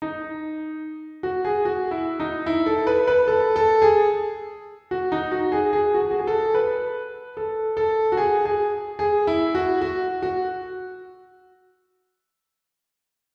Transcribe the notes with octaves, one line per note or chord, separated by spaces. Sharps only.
D#4
F#4
G#4
F#4
E4
D#4
E4
A4
B4
B4
A4
A4
G#4
F#4
D#4
F#4
G#4
G#4
F#4
G#4
F#4
G#4
A4
B4
A4
A4
F#4
G#4
G#4
G#4
E4
F#4
F#4
F#4